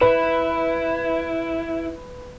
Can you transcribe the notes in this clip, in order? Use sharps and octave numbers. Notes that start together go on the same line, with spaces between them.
E4 B4